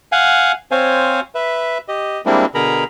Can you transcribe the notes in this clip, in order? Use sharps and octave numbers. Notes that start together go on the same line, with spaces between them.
F5 F#5 G#5
C4 C5 C#5 F5 G#5
B4 E5
G4 D#5
G3 G#3 A#3 C4 D4 E4
B2 D3 G#4 A#4 A#5 B5